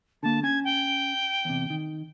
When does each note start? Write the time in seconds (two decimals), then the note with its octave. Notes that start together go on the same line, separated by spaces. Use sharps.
0.23 D3 A#3 A5
0.43 C#4 G#5 G#6
0.64 G5
1.45 E2 C3
1.70 D#3